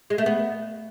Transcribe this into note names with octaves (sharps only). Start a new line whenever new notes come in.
G#3
A3
B3